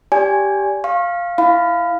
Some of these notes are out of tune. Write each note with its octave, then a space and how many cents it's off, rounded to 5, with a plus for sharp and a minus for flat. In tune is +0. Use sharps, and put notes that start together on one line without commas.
G4 +0 D5 -20 G#5 -5
F5 +0 C#6 -35
E4 +0 F5 +0 B5 +25